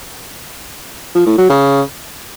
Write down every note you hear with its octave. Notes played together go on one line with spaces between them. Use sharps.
F3
A2
F#3
C#3